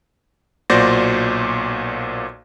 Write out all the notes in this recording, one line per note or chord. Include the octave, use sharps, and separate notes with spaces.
B1 A#2 F#4 C5 D5 A#6